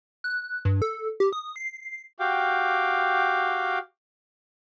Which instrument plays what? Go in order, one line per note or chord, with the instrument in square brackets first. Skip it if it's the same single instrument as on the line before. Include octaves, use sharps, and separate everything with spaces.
[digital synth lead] F#6
G2
A4
G4
D#6
C7
[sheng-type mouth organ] F#4 G4 F5 G5 D6